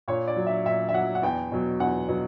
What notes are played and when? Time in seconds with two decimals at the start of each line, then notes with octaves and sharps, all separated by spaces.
0.08 A#2 C#5
0.28 D5
0.37 F#3
0.47 E5
0.65 A#2 E5
0.89 E5
0.94 F#3 F#5
1.15 F#5
1.23 E2 G5
1.52 B2 F#3
1.80 E2 F#5
2.08 B2 F#3